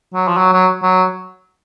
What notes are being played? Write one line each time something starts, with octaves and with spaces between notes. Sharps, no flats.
F#3
F3
F#3
F#3
F#3